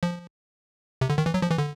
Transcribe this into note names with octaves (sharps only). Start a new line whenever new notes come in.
F3
C3
D3
D#3
E3
F#3
F3
E3
D3